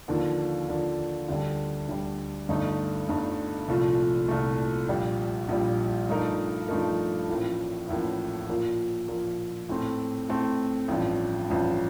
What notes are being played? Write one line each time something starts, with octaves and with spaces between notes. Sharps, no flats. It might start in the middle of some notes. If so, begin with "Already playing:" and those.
D#2 D3 F3 A#3
D#2 D3 F3 A#3
D2 D3 G3
D2 D3 G3
G1 G2 D3 A3 D#4
G1 G2 D3 A3 D#4
C2 A#2 F3 A3
C2 A#2 F3 A3
A#1 A#2 G3
A#1 A#2 G3
G2 F3 A3 D#4 A#4
G2 F3 A3 D#4 A#4
A1 A2 F3 A#3
A1 A2 F3 A#3
A#2 F3 A#3
A#2 F3 A#3
A2 A3 C4
A2 A3 C4
A1 G2 F3
A1 G2 F3